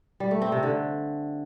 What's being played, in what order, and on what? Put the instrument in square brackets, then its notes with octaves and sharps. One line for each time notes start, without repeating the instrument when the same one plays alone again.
[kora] G3
A3
C4
C3
D3